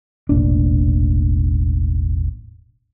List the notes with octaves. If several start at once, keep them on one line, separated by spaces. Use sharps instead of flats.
E1 A1 A#2 D4